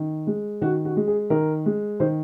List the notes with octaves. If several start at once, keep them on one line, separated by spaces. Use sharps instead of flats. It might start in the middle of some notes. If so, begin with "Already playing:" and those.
Already playing: D#3
G#3
D#3 F#4
F#4
G#3
G#4
D#3 A#4
G#3
D#3 C5